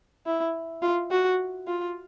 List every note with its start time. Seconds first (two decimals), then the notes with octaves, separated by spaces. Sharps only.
0.26 E4
0.82 F4
1.11 F#4
1.67 F4